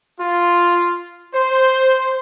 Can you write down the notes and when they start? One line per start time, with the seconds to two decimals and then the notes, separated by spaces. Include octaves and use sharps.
0.18 F4
1.33 C5